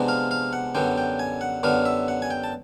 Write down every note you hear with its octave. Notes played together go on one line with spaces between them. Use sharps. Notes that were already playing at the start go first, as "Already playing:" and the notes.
Already playing: C3 F3 G#3 B3 D4
F5
F5
F#5
F#2 D3 G3 B3 G5
G5
G#5
F#5
F#2 D3 G3 B3 F5
E5
F#5
G#5
G5
A5